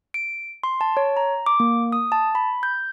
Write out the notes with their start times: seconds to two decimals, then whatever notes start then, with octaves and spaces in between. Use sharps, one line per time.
0.14 D7
0.64 C6
0.81 A5
0.97 C#5
1.17 A#5
1.46 D6
1.60 A#3
1.92 D#6
2.12 A5
2.35 B5
2.63 G6